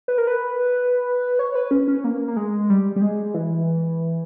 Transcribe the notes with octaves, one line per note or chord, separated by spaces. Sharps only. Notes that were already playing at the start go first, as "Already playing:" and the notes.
B4
A#4
B4
C#5
B4
C#4
C#4
A#3
A#3
G#3
G3
G3
G#3
E3